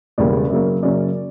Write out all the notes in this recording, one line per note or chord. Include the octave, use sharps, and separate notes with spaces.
E1 E2 C#3 G3 A#3 D5
F#2 C#3 F#3 A#3 C#4
F#2 C#3 F#3 A#3 C#4 D5